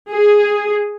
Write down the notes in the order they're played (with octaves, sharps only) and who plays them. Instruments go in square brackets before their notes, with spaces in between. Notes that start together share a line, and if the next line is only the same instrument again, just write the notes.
[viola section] G#4